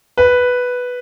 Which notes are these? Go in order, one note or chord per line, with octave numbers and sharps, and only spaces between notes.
B4